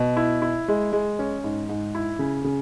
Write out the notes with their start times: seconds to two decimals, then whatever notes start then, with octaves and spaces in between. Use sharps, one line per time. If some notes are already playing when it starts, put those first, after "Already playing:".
Already playing: B2
0.17 E4
0.42 E4
0.68 G#3
0.93 G#3
1.19 C#4
1.44 G#2
1.69 G#2
1.95 E4
2.19 C#3
2.44 C#3